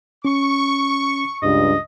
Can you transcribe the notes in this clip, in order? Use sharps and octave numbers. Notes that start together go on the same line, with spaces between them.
C#4 C#6
C#2 G2 D#5